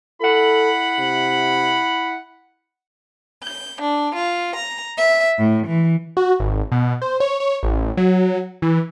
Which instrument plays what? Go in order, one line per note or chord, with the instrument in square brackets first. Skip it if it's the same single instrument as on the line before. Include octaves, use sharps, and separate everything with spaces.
[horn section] E4 F#5 B5 [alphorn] A4
[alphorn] C3
[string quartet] G6
D4
F4
A#5
E5
A2
E3
[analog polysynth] F#4
G#1
B2
C5
C#5
C#5
A1
F#3
E3